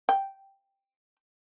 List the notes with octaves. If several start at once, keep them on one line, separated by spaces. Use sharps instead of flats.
G5